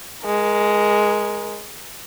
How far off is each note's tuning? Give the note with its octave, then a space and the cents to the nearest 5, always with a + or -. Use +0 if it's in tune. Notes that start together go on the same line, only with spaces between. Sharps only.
G#3 +0 A#4 +25